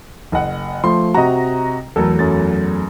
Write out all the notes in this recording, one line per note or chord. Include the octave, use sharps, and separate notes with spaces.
F#1 D#5 F#5
F3 A3 C6
C3 F#4 D#5 A#5
E2 F#3 A3 A4 A#4
F#2 A6